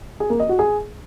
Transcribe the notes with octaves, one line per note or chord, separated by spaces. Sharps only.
G#4
A#3
D#5
F#4
G#4